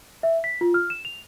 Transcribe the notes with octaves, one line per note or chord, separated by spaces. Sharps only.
E5
B6
F4
F6
E7
F7